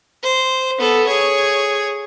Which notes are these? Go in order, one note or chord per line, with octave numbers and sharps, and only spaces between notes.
C5
B3 A4
G#4 C#5